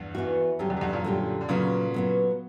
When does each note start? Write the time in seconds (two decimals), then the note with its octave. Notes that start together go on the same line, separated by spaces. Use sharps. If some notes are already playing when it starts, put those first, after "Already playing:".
Already playing: E2 G2
0.15 E3 B3 F#4
0.59 F#2 D3 G3 C#4 G4
0.70 E2
0.77 F#2
0.81 E2 G2
0.93 F#2 A#2
1.04 D3 G3 C#4 G4
1.41 D3
1.49 A#2 C#3 F#3 B3 F#4
1.94 F#3 B3 F#4